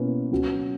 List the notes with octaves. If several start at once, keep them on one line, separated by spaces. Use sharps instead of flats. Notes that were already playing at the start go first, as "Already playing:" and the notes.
Already playing: B2 A#3 C#4 E4 B4
F#3 C#4 F#4